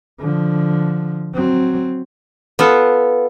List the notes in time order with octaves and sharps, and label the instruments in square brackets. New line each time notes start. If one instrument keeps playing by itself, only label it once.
[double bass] D3 F3
F#3 C4
[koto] B3 F4 A4